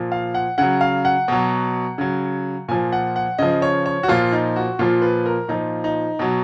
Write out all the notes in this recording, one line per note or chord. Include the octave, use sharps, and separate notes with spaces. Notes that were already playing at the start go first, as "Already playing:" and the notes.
Already playing: A#2 F3
F5
F#5
C#3 F#3 F#5
F5
F#5
B2 F#3
C#3 F#3
A#2 F3 G#5
F#5
F#5
C#3 F3 D#5
C#5
C#5
F#4
A#2 F3 F4
D#4
F#4
A#2 F3 F4
B4
A#4
A#2 F3 D#4
D#4
B2 F#3